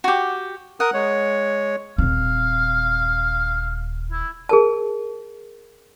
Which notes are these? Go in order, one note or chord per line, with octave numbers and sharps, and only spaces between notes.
F#4 G4
A#4 F#5 D#6
G#3 C#5
D#1 C4 F5
E4
G#4 A#4 A5